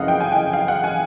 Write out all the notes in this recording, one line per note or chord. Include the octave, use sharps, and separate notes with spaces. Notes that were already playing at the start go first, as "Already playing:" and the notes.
Already playing: F#1 F2 C#3 E3 D#5 F5 F#5
G5
G#5
G5
F5
F#5
G#5